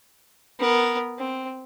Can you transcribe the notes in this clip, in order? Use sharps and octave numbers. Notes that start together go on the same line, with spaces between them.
B3 A#4
C4